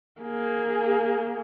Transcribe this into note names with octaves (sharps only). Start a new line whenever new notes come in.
A#3 G#4